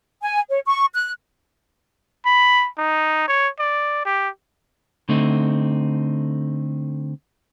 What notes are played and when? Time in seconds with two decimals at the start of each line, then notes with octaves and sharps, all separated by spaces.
0.21 G#5
0.50 C#5
0.65 C#6
0.94 F#6
2.26 B5
2.78 D#4
3.28 C#5
3.59 D5
4.05 G4
5.09 D3 A3 C4 D#4